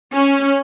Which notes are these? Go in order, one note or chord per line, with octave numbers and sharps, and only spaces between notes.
C#4